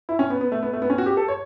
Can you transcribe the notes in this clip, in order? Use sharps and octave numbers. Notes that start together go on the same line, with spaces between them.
E4
C#4
B3
B3
A3
B3
A3
B3
C#4
F#4
G4
A4
C#5